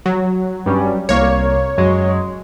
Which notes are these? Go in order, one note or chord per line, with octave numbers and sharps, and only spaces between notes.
F#3
G2 G3 C#4
C2 A#3 C#5
F#2 F#3 G#3